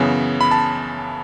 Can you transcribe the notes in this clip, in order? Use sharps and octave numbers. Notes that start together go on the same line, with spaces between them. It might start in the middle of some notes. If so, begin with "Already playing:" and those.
Already playing: F#2 C#3 E3 B3
B5
A5